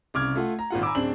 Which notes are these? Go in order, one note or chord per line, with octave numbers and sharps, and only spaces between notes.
C2 C#3 D6 F6 G#6
A3 F4 F#5
A#5
G#1 A#2 F4 F#5
G#5 A#5 B5 D6 E6
D1 C4 D4 F#7